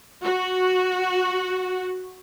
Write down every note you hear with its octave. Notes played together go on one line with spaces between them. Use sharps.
F#4